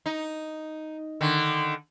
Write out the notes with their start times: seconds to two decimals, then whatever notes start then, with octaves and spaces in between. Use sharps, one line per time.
0.06 D#4
1.21 D3 D#3